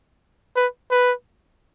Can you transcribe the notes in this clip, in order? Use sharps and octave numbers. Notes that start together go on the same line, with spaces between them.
B4
B4